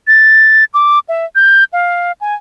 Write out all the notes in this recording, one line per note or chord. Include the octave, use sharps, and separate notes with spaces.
A6
D6
E5
G6
F5
G#5